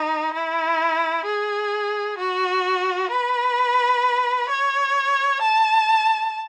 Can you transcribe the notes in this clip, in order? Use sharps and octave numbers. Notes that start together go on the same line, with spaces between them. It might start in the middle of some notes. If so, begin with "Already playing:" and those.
Already playing: D#4
E4
G#4
F#4
B4
C#5
A5